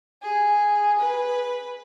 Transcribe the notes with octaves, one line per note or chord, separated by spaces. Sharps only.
G#4
B4